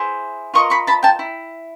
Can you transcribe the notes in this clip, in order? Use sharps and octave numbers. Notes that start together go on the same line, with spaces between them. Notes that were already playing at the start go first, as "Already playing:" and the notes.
Already playing: E4 G#4 C5
F4 A#4 D#5 C#6 D#6
B5 C#6
A5 B5
G5 A5
E4